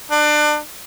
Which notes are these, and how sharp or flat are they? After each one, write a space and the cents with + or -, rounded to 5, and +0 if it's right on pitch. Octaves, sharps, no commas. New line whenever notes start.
D4 +30